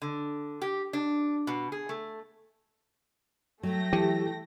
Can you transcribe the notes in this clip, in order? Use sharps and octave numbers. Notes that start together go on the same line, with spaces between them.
D3
G4
D4
B2
G#4
A3
F#3 A3 G5 A#6
E3 G4